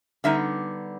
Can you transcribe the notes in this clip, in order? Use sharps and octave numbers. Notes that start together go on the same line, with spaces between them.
D3 G3 B3 D#4 E5